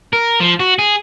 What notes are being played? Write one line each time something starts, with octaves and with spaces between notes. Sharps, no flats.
A#4
F3
F#4
G#4